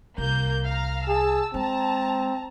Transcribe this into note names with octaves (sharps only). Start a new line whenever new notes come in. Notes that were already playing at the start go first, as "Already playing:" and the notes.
C2 A#3 G6
F5 A#5 F6
G#4 A5 E6
G#3 C4 A5 A#5